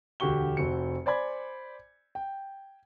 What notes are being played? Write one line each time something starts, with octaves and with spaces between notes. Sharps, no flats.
E1 D2 F#4 G4 C#6 G7
F1 C4 F#4 C5 C#7
C5 D5 G#5 B5 G#6
G5